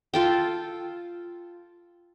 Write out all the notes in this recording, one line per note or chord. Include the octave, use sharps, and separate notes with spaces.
F4 A4 G5